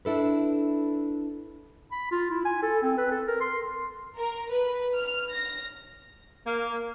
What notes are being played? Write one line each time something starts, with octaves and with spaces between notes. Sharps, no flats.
D4 E4 A4 B4
B5
F4
E4
G#5
A4
C4
B4
A4
A#4
C6
A#4
B4
F6
A#6
A#3